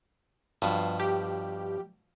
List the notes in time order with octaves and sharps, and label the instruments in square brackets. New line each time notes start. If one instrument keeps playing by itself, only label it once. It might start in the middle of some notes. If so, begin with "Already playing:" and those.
[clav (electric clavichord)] G2 [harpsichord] B2 F3
[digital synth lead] G4